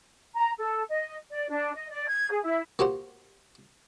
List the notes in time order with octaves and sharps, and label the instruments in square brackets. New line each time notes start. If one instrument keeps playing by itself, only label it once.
[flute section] A#5
A4
D#5
D5
D4
D#5
D5
G#6
G#4
E4
[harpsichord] A#3 F#4 G4 C5